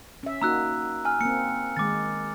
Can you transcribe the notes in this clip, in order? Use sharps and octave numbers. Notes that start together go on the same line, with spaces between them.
C#4 E5
A#3 D#4 F#4 A#5 E6 F#6
G#5 F6
A#3 C4 C#7
D#3 G#3 D6 A6